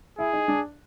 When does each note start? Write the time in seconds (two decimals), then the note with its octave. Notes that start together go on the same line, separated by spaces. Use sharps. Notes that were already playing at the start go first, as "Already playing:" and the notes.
0.19 E4 G#4
0.33 D#4
0.48 D4